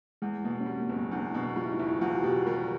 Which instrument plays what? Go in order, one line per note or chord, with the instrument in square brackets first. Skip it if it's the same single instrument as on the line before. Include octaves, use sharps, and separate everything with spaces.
[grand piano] E2 [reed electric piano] G#3
[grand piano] B2 [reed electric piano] A#3
[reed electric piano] C#4
[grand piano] G3 [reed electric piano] C4
[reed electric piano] A#3
[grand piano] F#1 [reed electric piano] B3
[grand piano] E2 [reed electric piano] D4
[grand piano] B2
[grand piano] G3 [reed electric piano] F4
[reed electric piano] E4
D#4
[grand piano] F#1 [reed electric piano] E4
[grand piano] E2 [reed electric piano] F4
[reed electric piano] F#4
[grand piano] B2 [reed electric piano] G4
[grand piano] G3 [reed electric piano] A#4